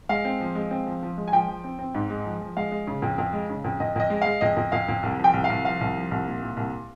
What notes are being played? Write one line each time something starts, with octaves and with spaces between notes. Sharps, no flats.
G#3 F5
C4
F3
G#3
C4
F3
F3
G#3
G#5
F3 G5
F3
C4
C4
G#2
G#3
F3
F3
G#3 F5
G#3
C#3
F2
F2
G#3
C#3
F2
F2 D#5
F2 D#5
G#3
G#3 F5
F2 D#5
F2
F2 F5
F2
C2
F3 G5
C2
F5
C2
F3 F5
C2
F3
C2
A#2
A#2
C2